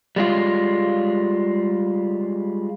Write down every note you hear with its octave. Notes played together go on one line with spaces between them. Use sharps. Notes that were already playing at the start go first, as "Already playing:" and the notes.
G3 G#3 F4